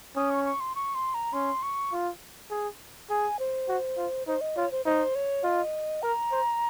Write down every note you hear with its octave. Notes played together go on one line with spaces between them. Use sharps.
C#4 D#6
C#6
C#6
C6
C#6
C6
A#5
C#4 C6
C#6
F4
G#4
G#4 G#5
C5
F#4
F4
D#4 C5
D#5
F4 C#5
C5
D#4 C5
C#5
F4 D#5
A#4 A#5
C5